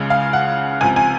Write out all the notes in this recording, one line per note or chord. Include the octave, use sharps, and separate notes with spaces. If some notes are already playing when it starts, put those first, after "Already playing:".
Already playing: C#2 C#3 G#3
F5
F#5
C#2 C3 F3 G#5
G#5